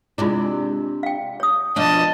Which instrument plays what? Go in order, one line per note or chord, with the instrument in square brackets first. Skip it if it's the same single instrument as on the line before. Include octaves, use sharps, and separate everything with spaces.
[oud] C3 G#3 D4 [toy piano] E4 F4
[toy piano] F5 G5
C#5 D#6
[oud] B2 F3 D4 [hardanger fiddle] D#5 A5